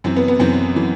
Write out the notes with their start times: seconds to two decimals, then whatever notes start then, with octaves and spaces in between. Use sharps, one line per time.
0.04 F#2 E3 C4
0.16 B3
0.28 B3
0.39 F#2 E3 C4
0.76 E3